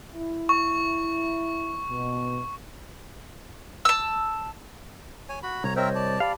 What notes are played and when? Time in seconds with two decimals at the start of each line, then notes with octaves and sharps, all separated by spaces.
0.13 E4
0.49 C#6
1.90 B2
3.85 A5 E6
5.29 C#5 G#5
5.43 F#4 B5
5.64 C2 C#5 A#5
5.76 C4 A#4 C5 C#5 D#5 E5
5.95 D5 A5
6.20 G4 D5 F5 A5 B5